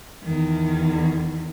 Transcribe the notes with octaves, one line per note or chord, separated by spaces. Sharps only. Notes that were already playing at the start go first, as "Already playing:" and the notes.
E2 D#3